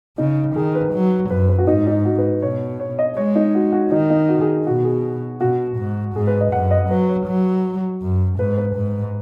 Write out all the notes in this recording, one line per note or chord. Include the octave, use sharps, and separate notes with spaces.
C#3 D#4
D#3 G#4
B4
F#3
F#2 B4
B4
F#4
G#2 D#4
D#4
F#4
B4
B2 C#5
C#5
D#5
G#3 C#5
D#4
F#4
F#4
D#3 D#4
D#4
F#4
G#4
B2 F#4
G#4
B2 F#4
G#2
G#2 G#4
B4
D#5
F#2 F#5
D#5
F#3 B4
C#5
F#3
F#2
G#2 B4
B4
G#2